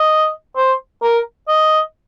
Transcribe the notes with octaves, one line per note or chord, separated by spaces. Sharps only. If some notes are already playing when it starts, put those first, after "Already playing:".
Already playing: D#5
C5
A#4
D#5